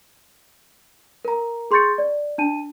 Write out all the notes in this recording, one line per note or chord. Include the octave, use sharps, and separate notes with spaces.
A#4 A#5
G#4 C6 C#6 G6 A6 C#7
D5
D4 A5 D#7